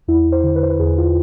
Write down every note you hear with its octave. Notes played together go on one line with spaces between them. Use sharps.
E2 E4
C5
D3
B4
C5
B4
E2 G#4
F4